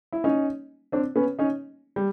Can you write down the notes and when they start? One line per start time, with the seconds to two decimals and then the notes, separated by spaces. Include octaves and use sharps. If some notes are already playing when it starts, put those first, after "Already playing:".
0.13 E4
0.24 C#4 D#4
0.92 C4 D4
1.16 B3 C#4
1.39 C#4 D#4
1.96 G3